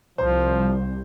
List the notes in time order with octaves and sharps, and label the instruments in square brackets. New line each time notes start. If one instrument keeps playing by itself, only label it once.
[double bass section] C2 [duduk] F3 [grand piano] C5